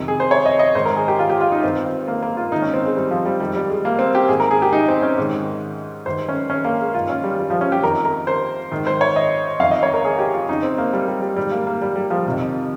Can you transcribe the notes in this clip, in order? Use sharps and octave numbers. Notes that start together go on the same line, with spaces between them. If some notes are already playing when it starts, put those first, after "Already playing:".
Already playing: F2 C3 D#3
G#4
C5
C#5
D#5
D#5
G#2 D#3 C5
A#4
G#4
G4
F4
G4
F4
D#4
G2 D#3 C4
A#3
A#3
F4
G#2 D#3 D#4
C#4
C4
G#3
G3
F3
G3
F2 D#3 G3
G3
G#3
A#3
C4
G4
G#2 D#3 G#4
A#4
G#4
G4
D#4
C4
C#4
G#2 D#3
G2 D#3 C5
C#4
C#4
A#3
G#3
G2 D#3 F4
C#4
G3
G3
F3
C#4
G4
F2 D#3 A#4
A#4
C5
G#2 D#3
C5
C#5
D#5
F2 D#3 F5
D#5
C#5
A#4
G#4
G4
F4
F2 C#3 D#4
C4
A#3
G3
G3
G3
G#2 D#3 G3
A#3
A#3
G3
G3
F3
F2 C3 D#3